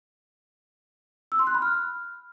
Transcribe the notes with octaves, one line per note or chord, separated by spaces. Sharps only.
E6
C6
F#6
B5
F6